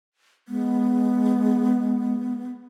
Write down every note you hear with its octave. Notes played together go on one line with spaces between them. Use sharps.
G#3 B3